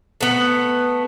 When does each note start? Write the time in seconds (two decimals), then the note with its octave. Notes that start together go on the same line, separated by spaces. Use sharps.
0.21 A3 B3